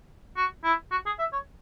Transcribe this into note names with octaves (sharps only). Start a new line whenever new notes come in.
F#4
E4
F#4
G#4
E5
C#5